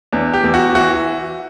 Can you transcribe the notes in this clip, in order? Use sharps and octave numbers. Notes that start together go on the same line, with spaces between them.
E2 D4
G4
E2
F#4
E3 F#4